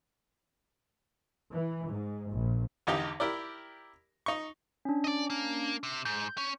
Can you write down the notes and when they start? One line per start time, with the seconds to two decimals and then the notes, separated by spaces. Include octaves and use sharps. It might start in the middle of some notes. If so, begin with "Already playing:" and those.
1.52 E3
1.90 G#2
2.31 A#1
2.87 G#1 E2 D3 D#4 G4
3.20 E4 G4 A#4 D5
4.26 D#4 C#6
4.85 C#4 D4
5.04 D5 D#5
5.30 A#3
5.83 C3
6.05 G#2 G6
6.38 C#4